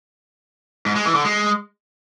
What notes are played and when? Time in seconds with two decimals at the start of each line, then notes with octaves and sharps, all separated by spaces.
0.86 G#2
0.96 G#3
1.05 E3
1.15 D3
1.25 G#3